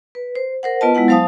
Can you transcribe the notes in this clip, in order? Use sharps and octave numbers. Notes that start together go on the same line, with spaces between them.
B4
C5
A#4 C5 F#5
B3 F4 B4 D#5 A5
G#3 B3 E4 F#5
F#3 C5 F5 A5 D#6